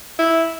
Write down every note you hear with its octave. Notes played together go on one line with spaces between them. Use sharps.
E4